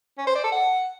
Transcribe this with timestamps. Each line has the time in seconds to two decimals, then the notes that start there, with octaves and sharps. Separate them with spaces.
0.18 C#4
0.27 C5
0.35 D5
0.44 A4
0.52 F#5